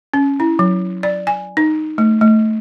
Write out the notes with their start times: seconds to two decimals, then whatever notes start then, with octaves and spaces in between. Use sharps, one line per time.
0.14 C#4
0.40 E4
0.59 F#3
1.03 D5
1.27 G#5
1.57 D#4
1.98 A3
2.21 A3